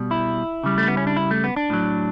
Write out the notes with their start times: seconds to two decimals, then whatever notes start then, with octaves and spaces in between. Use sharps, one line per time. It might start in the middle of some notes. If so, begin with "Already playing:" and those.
Already playing: B2 G3
0.11 E4
0.63 C#3 G3
0.78 A3
0.88 B3
0.97 C#4
1.07 D4
1.16 E4
1.31 A3
1.44 B3
1.56 D4
1.70 A2 F#3